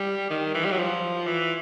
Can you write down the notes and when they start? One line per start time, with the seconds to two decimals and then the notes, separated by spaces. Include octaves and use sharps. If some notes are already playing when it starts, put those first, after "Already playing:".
Already playing: G3
0.30 D#3
0.54 E3
0.64 G3
0.71 F#3
0.79 F3
1.27 E3